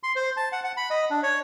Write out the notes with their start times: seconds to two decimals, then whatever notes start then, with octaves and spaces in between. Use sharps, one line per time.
0.03 C6
0.16 C5
0.37 A5
0.52 F#5
0.64 F#5
0.77 B5
0.90 D#5
1.10 D4
1.23 C#5